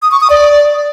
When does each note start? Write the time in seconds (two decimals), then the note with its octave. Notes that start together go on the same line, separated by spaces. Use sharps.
0.02 D#6
0.12 C#6
0.21 D#6
0.30 D5